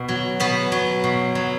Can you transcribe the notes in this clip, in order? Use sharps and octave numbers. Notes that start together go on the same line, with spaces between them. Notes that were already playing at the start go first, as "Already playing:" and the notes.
Already playing: B2 B3
F#3
B2 B3
F#3
B2
F#3